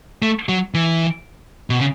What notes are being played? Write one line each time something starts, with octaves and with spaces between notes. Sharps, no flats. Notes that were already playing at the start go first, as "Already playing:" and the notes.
A3
F#3
E3
B2
C#3